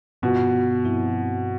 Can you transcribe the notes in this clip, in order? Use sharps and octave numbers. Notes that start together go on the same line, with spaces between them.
G2 B2 D3 F3 B3 F4
G2 F3 C4 E4